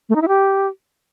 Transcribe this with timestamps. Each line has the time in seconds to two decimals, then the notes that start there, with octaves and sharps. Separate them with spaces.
0.09 A3
0.15 D#4
0.22 E4
0.28 G4